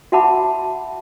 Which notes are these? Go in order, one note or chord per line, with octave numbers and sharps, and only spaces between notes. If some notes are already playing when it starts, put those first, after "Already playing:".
F#4 E5 F#5 A5 B5 D6